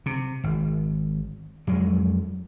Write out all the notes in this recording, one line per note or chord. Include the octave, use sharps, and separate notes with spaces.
C3
G#1
F2 F#3 G#3